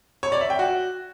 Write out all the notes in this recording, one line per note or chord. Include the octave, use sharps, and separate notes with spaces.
C#5
D5
E5
G5
F#4